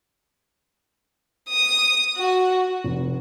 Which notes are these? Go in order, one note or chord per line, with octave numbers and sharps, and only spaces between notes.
D#6
F#4
F1